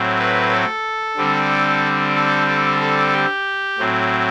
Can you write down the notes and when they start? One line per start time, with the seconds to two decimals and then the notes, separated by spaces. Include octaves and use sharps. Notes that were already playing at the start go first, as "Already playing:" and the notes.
Already playing: A2 F#3 C4
0.19 B4
0.52 A4
1.17 D3 G3 C4
2.15 A4
2.47 A4
2.80 A4
3.13 G4
3.78 A2 F#3 C4